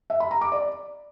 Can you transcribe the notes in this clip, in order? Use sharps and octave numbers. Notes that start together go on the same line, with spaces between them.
E5
B5
A#5
D6
D5